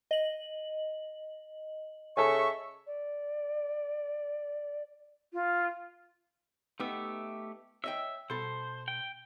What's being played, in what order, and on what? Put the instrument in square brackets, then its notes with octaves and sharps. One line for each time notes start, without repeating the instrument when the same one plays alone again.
[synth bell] D#5 F#7
[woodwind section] C#3 E5 C#6 [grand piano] A4 G#5
[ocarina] D5
[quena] F4
[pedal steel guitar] A3 G4 E5 [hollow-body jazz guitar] B3 D#4
[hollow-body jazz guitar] C#5 D#5 G5 [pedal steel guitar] E5
[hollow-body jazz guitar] B2 A4 [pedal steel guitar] C5
[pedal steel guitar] G5